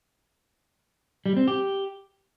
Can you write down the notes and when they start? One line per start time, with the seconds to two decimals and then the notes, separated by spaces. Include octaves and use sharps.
1.26 G3
1.37 C4
1.48 G4